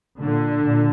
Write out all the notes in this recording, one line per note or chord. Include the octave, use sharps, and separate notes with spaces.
A#2 D3
A#2